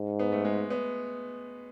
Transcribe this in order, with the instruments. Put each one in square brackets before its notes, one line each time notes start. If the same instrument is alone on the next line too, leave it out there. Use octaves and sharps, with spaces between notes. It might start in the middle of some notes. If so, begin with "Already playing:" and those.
Already playing: [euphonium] G#2
[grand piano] B3
A3
G#3
B3